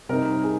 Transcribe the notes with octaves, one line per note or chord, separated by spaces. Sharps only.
C3 G3 C4 D#4 A#4
G#4